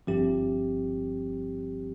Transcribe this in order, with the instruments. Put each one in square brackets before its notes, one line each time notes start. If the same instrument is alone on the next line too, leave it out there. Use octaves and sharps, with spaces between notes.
[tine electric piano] G1 G2 F3 C4 G4